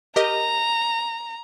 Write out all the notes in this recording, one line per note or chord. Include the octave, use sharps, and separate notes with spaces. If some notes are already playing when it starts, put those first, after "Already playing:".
G4 A#4 D#5 A#5